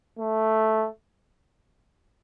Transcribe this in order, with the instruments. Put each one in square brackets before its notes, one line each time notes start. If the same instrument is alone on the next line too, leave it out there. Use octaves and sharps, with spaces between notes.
[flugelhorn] A3